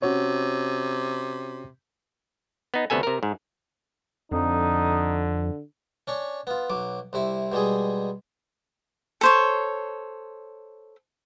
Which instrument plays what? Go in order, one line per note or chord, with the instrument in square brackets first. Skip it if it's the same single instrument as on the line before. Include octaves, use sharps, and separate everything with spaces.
[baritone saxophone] C3 [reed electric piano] C#4 F#4 C#5
[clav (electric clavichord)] B3 D#4
D2 C3 B3 A4 G#5
C3 A#4
G#2
[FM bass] F2 [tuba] D3 [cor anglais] D#4
[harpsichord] C#4 D4 C#5
B3 F4
B1 F#3 D6
C2 C3 E4
B2 G3 G#3 G#4
[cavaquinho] A4 C5 C#5